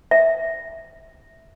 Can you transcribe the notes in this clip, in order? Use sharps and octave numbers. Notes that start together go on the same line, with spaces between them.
E5